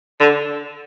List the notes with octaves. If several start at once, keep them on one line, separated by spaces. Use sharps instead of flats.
D3